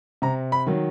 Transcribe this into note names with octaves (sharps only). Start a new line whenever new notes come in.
C3 A#5
B5
D#3 F#3